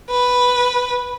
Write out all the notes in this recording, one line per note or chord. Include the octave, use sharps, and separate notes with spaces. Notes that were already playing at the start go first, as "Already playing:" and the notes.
B4